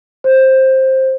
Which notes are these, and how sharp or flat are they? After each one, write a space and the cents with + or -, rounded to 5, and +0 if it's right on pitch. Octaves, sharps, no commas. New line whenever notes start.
C5 +10